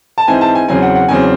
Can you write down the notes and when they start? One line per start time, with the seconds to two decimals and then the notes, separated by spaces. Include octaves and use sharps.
0.18 A5
0.28 G#2 E3 C4 G#5
0.41 A5
0.55 G#5
0.68 E2 C#3 F#3 C4 G#5
0.82 F#5
0.95 F#5
1.08 E2 C#3 F#3 C4 G#5